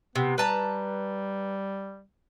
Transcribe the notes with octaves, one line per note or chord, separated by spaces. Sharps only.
C3 B3
G3 B4 A5 A#5